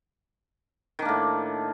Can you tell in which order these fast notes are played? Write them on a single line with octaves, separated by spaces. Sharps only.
D#3 D4 A#3 A2